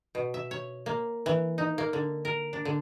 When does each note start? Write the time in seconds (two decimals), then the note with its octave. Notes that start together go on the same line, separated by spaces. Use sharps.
0.15 B2
0.34 E5
0.51 C#5
0.86 A#3
1.26 E3
1.58 D#4
1.78 A#3
1.93 D3
2.25 A#4
2.53 D4
2.65 D3